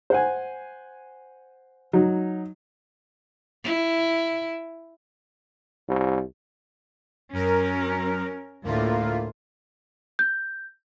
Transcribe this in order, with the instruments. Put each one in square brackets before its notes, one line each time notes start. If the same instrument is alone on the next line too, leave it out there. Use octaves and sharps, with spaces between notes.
[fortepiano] C5 F#5 G#5
F#3 D#4
[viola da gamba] E4
[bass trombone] C2
[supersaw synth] F#2 A#4 [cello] C#4
[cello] D2 A2 [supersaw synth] A#3 F4
[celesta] G6